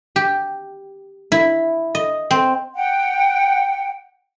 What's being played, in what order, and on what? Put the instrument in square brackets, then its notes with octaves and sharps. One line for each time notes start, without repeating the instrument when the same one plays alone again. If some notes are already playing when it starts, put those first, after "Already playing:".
[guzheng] G4
E4
D#5
C4
[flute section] F#5 G5